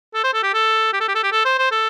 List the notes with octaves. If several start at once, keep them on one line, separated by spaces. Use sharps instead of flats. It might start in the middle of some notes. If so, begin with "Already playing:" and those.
A4
C5
A4
G4
A4
G4
A4
G4
A4
G4
A4
C5
C5
A4